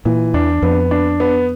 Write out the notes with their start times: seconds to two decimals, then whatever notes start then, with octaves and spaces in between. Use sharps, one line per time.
0.05 A#2 E3
0.34 E2 D4
0.62 F2 B3
0.91 D4
1.20 B3